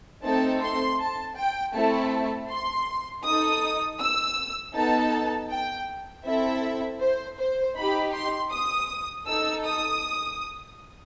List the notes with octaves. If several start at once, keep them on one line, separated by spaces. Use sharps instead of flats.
A3 C4 D#4 A4 A5
C6
A5
G5
A3 C4 E4 A4 A5
C6
D#4 A4 D#6
E6
B3 D#4 A4 A5
G5
C4 E4 A4 E5
C5
C5
D#4 G4 B5
C6
D#6
D#4 A4 E6
D#6